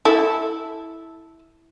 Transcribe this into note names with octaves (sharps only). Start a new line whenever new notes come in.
E4 A4